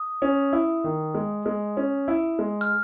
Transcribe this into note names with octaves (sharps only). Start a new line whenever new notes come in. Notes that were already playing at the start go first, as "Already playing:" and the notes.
Already playing: D#6
C#4
E4
D#3
G#3
G#3
C#4
E4
G#3
F6